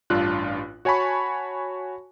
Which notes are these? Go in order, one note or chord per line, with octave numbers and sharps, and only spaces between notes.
A1 G2 D4 F4 F#6
F#4 C#5 G#5 A5 B5 C#6